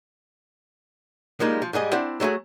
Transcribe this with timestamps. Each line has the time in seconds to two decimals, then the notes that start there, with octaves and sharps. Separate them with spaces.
1.40 F3 G3 G#3 A#3 D#4
1.62 F3
1.73 G#2 G3 G#4 D#5
1.92 C4 D4 E4 C5 D5 F#5
2.20 F#3 G3 A3 F#4 G#4